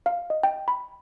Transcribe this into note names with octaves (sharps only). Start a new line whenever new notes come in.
F5
D#5
G5
B5